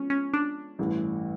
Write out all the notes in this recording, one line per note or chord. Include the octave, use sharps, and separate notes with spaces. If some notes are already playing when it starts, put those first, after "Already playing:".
Already playing: F3 G#3 B3 C#4
C#4
D4
A1 G2 E3 A3